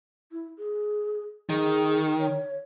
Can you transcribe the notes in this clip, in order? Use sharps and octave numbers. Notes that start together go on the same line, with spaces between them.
E4
G#4
D#3 G#4
C#5